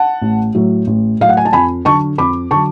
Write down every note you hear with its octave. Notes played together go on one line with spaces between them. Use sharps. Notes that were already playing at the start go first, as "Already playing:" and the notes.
Already playing: F#5 A5
A1
A2 F#3
A1
A2 F#3 F5
F#5
G#5
A5
F2 G#5 B5
D3 F#3 A5 C#6
F2 B5 D6
D3 F#3 A5 C#6